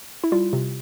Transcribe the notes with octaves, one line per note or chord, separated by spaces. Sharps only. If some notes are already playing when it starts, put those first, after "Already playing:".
E4
G3 F4
C3